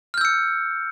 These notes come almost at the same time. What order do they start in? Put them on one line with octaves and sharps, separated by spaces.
F6 G6 E6 C#7